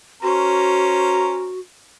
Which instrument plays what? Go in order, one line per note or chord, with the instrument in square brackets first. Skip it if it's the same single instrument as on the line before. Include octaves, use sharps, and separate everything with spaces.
[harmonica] C#4 A#4 C5 [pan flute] F#4